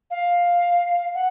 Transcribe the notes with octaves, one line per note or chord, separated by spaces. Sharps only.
F5
F#5